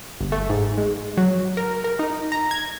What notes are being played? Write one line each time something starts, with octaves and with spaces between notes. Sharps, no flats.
G1
A3
G#2
G#3
F#3
A#4
A#4
D#4
A#5
G#6